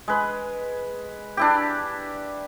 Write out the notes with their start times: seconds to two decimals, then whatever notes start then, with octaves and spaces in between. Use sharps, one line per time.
0.08 G#3 B4
1.37 D4 E4 G4